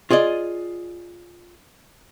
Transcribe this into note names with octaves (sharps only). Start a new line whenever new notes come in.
F4 G#4 D5 D#5